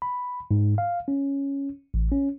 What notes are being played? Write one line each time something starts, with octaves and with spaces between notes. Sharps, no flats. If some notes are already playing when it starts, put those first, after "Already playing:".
B5
G#2
F5
C#4
A1
C#4